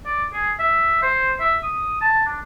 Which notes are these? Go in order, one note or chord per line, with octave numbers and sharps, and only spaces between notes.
D5
G#4
E5
C5
E5
D#6
A5
D4